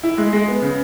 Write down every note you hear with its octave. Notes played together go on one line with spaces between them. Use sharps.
E4
G#3
G#3
B3
C#3